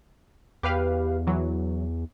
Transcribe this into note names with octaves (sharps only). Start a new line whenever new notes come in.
E2 G4 B4 F5
E3 F#3